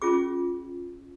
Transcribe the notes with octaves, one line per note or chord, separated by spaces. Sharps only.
C#4 F4 G#4 D6